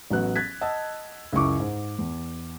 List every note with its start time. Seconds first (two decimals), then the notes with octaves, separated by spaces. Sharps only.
0.10 A1 F#3 B3 F#6
0.36 F#6 G#6 A6 B6
0.61 D#5 F#5 A5 E6
1.33 C#2 F#2 E4 C#6 D6
1.60 G#2
1.99 E2